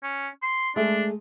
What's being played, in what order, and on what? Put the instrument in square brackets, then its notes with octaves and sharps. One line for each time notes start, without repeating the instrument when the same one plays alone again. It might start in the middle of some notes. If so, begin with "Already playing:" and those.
[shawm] C#4
C6
[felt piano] G#3 A3 [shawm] D4